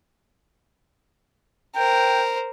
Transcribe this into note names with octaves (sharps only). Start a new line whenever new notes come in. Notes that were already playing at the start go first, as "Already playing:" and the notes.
A#4 C5 G5